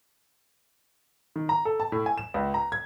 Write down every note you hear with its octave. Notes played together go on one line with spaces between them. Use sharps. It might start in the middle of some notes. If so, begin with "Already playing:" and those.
D#3
A#5
A4
A5
A2
G#5
E7
C#2
A#5
G#6